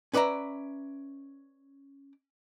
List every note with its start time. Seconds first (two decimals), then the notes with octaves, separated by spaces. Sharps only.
0.13 C#4 B4 D5 E5 A#5